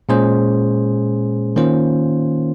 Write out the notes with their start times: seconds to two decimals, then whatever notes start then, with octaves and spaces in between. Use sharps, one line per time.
0.09 A#2 G#3 C#4 G#4 C5
1.56 D#3 A#3 C#4 F4 C5